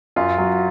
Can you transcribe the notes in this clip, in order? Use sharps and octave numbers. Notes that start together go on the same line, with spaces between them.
F#2 F4
F#3